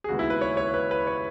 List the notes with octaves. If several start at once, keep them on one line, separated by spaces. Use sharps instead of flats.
G#4
D#2 C#3 G#3 B3 F#4
E4
B4
C#5
C#5
B4
B4
C#5